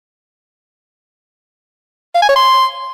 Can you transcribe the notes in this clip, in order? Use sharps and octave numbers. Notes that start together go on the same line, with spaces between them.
F5
G#5
C#5
C6